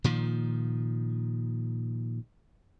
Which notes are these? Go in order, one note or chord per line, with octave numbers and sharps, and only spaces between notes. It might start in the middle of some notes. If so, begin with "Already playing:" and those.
A#2 D#3 F3